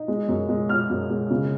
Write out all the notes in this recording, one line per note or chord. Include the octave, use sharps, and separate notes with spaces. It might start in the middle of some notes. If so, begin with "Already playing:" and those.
Already playing: D#4
G#3
F#2
G#3
G#3 F6
F#2
G#3
C#3